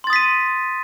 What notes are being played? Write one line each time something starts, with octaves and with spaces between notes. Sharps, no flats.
C6 D#6 A6 B6 D#7